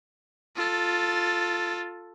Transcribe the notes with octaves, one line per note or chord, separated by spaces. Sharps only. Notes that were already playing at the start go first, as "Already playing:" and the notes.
F4 A4